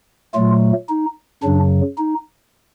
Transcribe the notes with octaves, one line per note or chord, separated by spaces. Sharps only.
A#2 F#3 A3 F4
D#4
F#2 C#3 F#3 D4
D#4